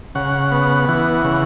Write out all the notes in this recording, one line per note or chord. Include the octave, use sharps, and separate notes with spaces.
C#3 F#5
B3
E3 F#5
C#3